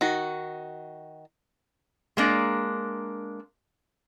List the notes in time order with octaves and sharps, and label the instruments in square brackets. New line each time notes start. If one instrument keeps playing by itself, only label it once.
[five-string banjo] D#3 F#4
[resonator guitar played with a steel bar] G#3 A#3 D4